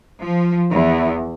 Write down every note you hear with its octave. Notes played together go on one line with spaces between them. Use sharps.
F3
E2